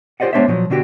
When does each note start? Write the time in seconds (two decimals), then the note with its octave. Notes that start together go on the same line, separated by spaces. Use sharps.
0.20 F4 G4 C5 D5 D#5 F#5
0.33 G#3 B3 D4 C5 C#5 E5
0.48 A#2 F3 F#3
0.70 B2 D3 D4 F#4 G4